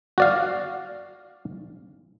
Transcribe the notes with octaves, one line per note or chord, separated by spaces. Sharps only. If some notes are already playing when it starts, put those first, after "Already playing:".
F#4 D5 F5